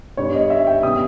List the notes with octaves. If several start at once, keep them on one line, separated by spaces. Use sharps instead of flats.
G2 G3 B3 C#5
D#5
E5
G5
C#3 G3 B3 D#6